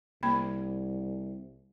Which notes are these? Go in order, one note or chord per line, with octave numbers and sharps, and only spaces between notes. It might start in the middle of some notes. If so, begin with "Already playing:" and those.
C2 A#3 B5